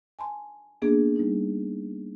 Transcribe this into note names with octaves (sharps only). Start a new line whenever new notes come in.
G#5 A5 C6
A#3 B3 D4 G#4
G3 D#4